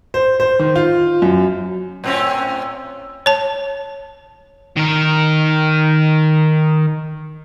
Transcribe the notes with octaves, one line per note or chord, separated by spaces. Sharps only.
C5
C5
D#3
F4
F#2
A2 C4 C#4
C#5 A5
D#3 A#4